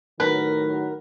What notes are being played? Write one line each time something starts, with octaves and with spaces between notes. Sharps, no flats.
A2 D#3 F#3 A#4 B4